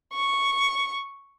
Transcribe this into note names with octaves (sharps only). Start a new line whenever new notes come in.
C#6